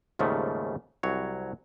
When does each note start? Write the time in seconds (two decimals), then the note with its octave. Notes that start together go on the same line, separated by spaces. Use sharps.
0.19 D#2 G#2 C#3 F3 G3 A3
1.03 C2 F#3 C#5